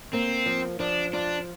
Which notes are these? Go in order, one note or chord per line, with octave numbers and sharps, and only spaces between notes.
A#3 C4
F3
F3 D4
D4 F4